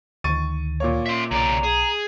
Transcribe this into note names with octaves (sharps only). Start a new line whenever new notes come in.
D2 D#3 C#6 A6 D#7
A#2 A#3 C#5
E5 C6
B1 C#3 D5 A#5
G#4